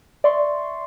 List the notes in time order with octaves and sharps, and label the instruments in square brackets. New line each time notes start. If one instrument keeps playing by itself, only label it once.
[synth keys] D5 E5 C6 C#6